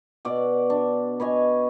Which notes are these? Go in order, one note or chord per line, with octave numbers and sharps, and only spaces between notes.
B2 D5 F#5
D4
B4 C#5 D#5 G#5